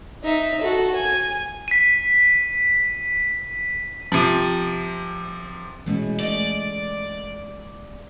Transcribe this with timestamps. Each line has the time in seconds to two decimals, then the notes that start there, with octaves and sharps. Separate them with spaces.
0.24 D#4 E5
0.61 F#4 A4
0.95 G#5
1.68 B6 D#7
4.12 C3 F3
5.86 B2 E3 G#3 A3 C#4
6.20 A3 D5 D#5